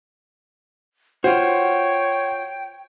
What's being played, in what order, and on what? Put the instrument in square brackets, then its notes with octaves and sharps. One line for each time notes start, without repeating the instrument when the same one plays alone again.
[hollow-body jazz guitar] F4 F#4 [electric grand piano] C5 [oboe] C#5 [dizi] G5